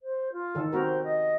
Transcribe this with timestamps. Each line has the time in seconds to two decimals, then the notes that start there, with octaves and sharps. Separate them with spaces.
0.01 C5
0.32 F4
0.55 D#3 A4
0.72 C4 F#4 A#4 C5
1.04 D#5